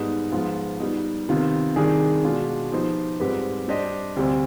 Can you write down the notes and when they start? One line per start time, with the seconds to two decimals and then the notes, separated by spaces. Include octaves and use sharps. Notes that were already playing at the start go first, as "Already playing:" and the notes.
Already playing: G#2 G3 B3 D#4
0.32 G#2 F3 G#3 B3 F4
0.80 G3 B3 D#4
1.29 C3 D#3 B3 F4
1.76 C3 D#3 G3 D4 G#4
2.24 B2 G#3 D4 F4
2.72 F3 B3 D#4 G4 C5
3.20 G#2 G3 C4 G4 B4
3.68 G3 D4 G4 C5 D#5
4.17 D2 C3 G3 C4